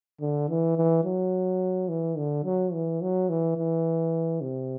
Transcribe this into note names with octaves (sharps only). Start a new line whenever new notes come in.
D3
E3
E3
F#3
E3
D3
F#3
E3
F#3
E3
E3
C3